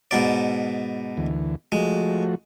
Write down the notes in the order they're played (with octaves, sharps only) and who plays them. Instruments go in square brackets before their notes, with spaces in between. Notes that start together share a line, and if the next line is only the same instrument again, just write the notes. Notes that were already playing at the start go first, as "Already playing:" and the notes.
[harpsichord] G#2 B2 D5
[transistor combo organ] D2 E3
[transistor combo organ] F3 A3 F#4 [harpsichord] G#3